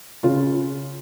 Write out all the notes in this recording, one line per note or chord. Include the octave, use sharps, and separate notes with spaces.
C#3 F4